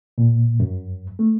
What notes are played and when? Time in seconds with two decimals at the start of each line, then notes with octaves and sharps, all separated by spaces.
0.18 A#2
0.60 F#2
1.19 A3